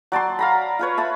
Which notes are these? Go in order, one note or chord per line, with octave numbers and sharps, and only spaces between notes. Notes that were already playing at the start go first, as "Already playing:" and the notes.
F#3 D5 A5 C6
F5 A#5 B5
F4 B4 C#5
E5 A5 B5